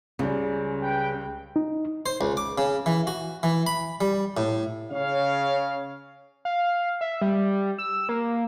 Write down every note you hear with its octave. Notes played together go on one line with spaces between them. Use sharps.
C#2 C#3 G3
B4 G5
D#4
C5
C#2
D6
C#3
E3
F#4
E3
B5
G3
A2
C#3 C#5 F5
F5
E5
G3
E6
A#3